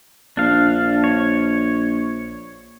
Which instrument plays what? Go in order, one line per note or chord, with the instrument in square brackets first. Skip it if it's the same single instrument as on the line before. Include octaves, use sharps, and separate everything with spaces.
[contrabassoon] A#1 [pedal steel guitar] D4 F5
[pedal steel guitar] C#5